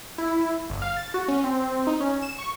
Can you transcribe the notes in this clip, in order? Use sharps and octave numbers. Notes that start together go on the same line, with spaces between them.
E4
G1
F5
A6
F#4
C#4
C4
D#4
C#4
E7
C#6